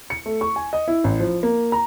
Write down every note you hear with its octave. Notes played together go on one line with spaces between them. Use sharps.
C#7
A3
C#6
G#5
D#5
E4
A1
F3
A#3
A#5